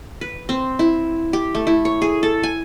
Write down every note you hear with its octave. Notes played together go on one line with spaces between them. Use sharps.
B4
C4
E4
G4
A3
E4
C#5
G#4
A4
G#5